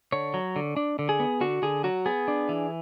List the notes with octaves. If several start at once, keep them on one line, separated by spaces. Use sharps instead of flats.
D3 C#5
F#3
D3
D4
D3
G#4
B3
D3 F#4
D3 G#4
F#3 F#4
B3 G#4
D4
E3